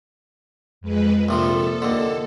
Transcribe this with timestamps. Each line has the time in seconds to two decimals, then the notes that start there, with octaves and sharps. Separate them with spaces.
0.81 F2 G#3 B4
1.29 A#1 C3 F3 A4
1.82 D#2 D3